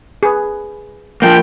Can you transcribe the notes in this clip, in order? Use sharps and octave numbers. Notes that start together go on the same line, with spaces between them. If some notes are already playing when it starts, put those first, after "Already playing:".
G#4 B4
F3 A#3 G5